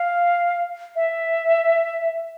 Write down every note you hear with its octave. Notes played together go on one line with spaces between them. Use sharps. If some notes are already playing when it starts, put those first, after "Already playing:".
Already playing: F5
E5